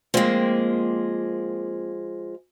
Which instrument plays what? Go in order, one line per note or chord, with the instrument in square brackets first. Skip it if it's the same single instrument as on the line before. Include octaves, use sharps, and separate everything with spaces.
[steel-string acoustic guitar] F3 G#3 [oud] A#3 C4 F4